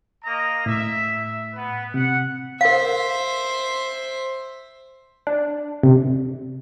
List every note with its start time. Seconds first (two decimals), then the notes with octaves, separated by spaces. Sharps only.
0.25 A#3 D#5 A#5
0.66 A2 E5
1.54 B3 B4
1.94 C3 F#5
2.61 A#4 C5 E5 F5
5.27 D4
5.83 C3